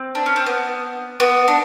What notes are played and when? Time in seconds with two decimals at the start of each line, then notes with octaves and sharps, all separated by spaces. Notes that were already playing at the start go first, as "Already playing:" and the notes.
Already playing: C4
0.15 D4
0.26 C#4
0.36 C4
0.46 B3
1.20 B3
1.48 D4